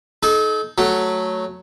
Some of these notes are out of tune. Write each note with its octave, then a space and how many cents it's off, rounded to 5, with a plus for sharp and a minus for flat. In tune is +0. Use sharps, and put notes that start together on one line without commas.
D#4 +0 A4 -40
F#3 +0 A3 -5